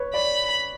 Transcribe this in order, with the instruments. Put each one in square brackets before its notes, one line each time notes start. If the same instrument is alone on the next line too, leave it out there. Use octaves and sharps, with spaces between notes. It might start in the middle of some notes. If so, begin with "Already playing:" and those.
Already playing: [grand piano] B4 C#5
[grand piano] D5 [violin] B5